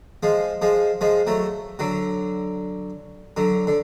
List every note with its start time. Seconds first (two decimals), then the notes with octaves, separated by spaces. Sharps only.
0.23 F3 G#3
0.62 F3 G#3
1.01 F3 G#3
1.27 F#3 A3
1.79 D3 F#3
3.37 D3 F#3
3.67 D3